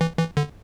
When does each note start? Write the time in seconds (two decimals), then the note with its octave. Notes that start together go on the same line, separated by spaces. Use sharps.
0.01 E3
0.18 E3
0.37 D3